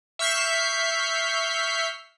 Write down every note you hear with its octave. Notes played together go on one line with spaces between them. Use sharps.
E5 C#6 F6 G6 B6 C7